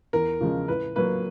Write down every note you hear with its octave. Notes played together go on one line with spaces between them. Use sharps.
E2 A#4
C#3 F3 G#3
A2 B4
F#3 A#3 B4